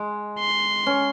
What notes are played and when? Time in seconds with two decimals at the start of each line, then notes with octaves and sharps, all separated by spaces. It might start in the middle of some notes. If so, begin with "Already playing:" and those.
Already playing: G#3
0.39 C6
0.86 C#4